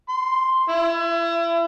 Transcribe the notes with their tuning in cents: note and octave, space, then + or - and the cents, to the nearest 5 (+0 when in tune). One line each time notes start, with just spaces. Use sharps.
C6 +0
E4 +35